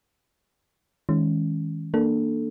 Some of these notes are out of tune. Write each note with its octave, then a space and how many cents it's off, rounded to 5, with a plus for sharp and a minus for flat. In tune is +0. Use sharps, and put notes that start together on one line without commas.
D#3 +40 G#3 +0 C#4 +0
A#3 +0 D4 +15 A4 +0